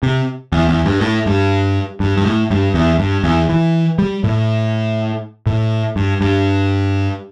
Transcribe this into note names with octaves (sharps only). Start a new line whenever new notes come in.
C3
E2
E2
G2
A2
G2
G2
G2
A2
G2
E2
G2
E2
E3
G3
A2
A2
G2
G2